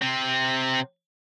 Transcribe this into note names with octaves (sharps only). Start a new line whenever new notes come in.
C3 C4